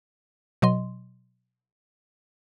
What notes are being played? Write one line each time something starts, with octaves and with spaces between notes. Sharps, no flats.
B2 F#3 D#5 C6